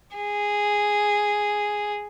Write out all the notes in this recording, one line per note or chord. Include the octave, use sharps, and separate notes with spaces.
G#4